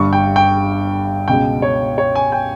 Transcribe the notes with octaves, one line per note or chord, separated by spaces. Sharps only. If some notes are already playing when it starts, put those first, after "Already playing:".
Already playing: G1 G2 G3 C#6
G5
G5
C#2 B2 G#3 G5
C#5
C#5
G#5
G5